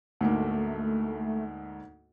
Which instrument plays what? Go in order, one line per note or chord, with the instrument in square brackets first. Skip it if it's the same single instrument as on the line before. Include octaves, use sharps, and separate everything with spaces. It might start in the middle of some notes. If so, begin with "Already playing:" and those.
[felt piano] D2 G#2 A#3 [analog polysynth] A3